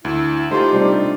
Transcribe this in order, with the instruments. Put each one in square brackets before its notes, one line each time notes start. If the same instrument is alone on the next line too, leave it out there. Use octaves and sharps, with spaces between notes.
[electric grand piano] D2 [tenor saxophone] E4
[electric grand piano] A3 F4 [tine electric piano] D#4 [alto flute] G4 [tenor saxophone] C5
[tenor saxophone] C3 [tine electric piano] G3 D4 D#4